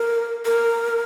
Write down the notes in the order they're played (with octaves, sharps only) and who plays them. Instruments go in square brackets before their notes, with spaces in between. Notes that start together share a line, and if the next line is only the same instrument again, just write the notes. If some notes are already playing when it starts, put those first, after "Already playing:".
Already playing: [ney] A#4
A#4